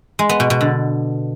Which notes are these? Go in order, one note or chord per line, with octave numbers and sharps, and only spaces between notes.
G#3
B3
B2
B2
D3